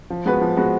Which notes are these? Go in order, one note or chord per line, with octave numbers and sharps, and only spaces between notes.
F3
G#3 B3 F#4 B4
F3
G#3 B3 F#4 B4